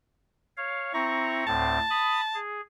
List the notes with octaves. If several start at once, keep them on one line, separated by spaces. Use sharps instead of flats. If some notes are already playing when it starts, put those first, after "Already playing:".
C#5 F5
C4 E4 A#5 C#6
D2 A2 C4 A5
B5 D#6
G#4